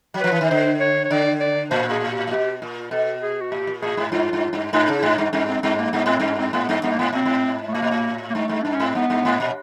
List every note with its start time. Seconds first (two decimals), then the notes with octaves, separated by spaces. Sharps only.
0.14 F#3
0.21 F3 B4
0.32 E3
0.41 D#3
0.50 D3 C5
0.80 C#5
1.05 C#5
1.10 D3 D5
1.41 D5
1.71 A2 C5
1.91 G#4
2.11 G4
2.27 A#2
2.31 B2 G4
2.62 A#2
2.91 B2 A4
3.22 G#4
3.41 F#4
3.51 A2 G4
3.67 A#2
3.82 A2 G#4
3.97 G#2
4.12 G2 F4
4.33 G2
4.53 G2
4.72 G#2 D#4
4.88 C#3
4.99 E4
5.03 G#2 D#4
5.18 G2
5.33 G2 C#4
5.48 C4
5.63 G2 C4
5.78 A#3
5.93 G2 B3
6.06 G#2 C4
6.20 G2 C#4
6.38 C4
6.53 G#2 B3
6.69 G2
6.83 G2 B3
6.92 A#3
6.99 G#2 B3
7.13 A2 C4
7.25 G#2
7.68 A3
7.74 A2 A#3
7.82 A#2
7.91 A2
8.30 A#3
8.35 G2 A3
8.49 G2
8.64 G2 D4
8.74 C#4
8.80 G#2 C4
8.95 G2 B3
9.10 G2
9.25 G#2
9.40 A#2